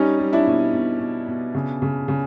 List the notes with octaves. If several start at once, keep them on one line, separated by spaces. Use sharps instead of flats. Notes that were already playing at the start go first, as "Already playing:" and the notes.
Already playing: G3 C#4 D#4
G3
D4 E4
B2
B2
B2
B2
C#3
C#3
C#3